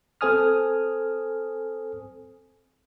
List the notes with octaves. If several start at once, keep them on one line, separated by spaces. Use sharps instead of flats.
C4 A4 C5 G#5 D#6 F6